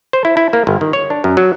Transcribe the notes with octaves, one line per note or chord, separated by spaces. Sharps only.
C5
E4
E4
A#3
G1
D#3
C#5
D4
F#2
F#3